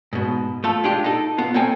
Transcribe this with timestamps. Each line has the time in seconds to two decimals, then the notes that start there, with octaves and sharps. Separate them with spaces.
0.13 G#2 B2
0.64 A3 F4 A4
0.84 G#3 D4 F4 G4
1.04 D#4 A4
1.38 B3 F4
1.54 A#3 C4 A4 G5 G#5